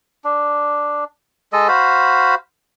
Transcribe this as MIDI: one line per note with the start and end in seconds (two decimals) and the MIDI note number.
0.24 1.04 62
1.53 1.68 56
1.53 1.68 69
1.53 1.68 75
1.68 2.35 66
1.68 2.35 72
1.68 2.35 77
1.68 2.35 83